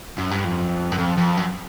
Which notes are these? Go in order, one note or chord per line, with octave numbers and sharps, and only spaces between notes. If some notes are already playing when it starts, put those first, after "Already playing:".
F#2
G2
F2
F#2
F2
F2
F#2